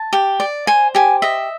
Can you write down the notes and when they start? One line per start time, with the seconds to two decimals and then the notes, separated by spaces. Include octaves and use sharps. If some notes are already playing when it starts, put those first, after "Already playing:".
Already playing: A5
0.13 G4
0.40 D5
0.67 C5 G#5
0.95 G4 G#5
1.22 D#5 E5